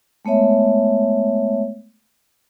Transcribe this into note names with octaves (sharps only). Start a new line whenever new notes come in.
G#3 A3 B3 C#5 E5